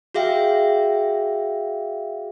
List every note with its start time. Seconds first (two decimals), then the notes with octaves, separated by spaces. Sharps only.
0.14 F#4 G#4 E5 F5 G5